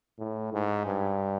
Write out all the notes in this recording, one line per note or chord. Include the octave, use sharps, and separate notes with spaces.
A2
G#2
G2